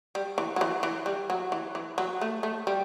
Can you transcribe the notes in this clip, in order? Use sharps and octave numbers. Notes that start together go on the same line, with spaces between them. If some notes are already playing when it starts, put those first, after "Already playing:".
G3
E3
F#3
E3
E3
G3
F#3
E3
E3
F#3
A3
A3
G3